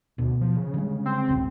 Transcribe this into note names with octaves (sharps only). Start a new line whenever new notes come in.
D2 B2
F3
C#3
D3 G3 G#3
C4
E1 A1 D2